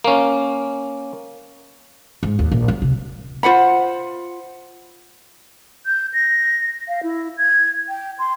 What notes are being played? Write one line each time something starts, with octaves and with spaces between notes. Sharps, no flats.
A#3 C#4
G#2
D#2
A#1
F#3
C3
F4 C5 F#5 B5
G6
A#6
F5
E4
G#6
G5
C6